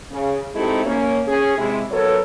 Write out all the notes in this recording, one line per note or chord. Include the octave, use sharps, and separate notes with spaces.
C#3
G#3 A3 C4 D#4 E4 G4
A#3 C#4
C#4 G#4
C3 G#3 E4
F#3 B3 A4 A#4 C#5